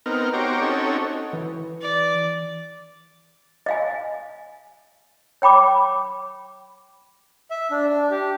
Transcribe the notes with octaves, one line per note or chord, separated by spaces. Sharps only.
B3 C4 D#4 A#4 F6
F#4 G4 C5 C#5 A#5 D6
C4 C#4 D#4 F#4 A4 C#5
E3
D5
D#5 F5 G#5
C#5 G5 B5 D6
E5
D4
D4
G4